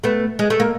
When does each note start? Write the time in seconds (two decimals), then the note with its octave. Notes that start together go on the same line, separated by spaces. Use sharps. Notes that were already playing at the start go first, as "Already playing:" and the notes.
0.04 A3 B3
0.39 G#3
0.50 A3
0.60 A#3